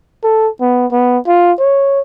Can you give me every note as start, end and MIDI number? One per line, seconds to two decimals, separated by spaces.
0.24 0.49 69
0.61 0.87 59
0.92 1.18 59
1.27 1.52 65
1.59 2.00 73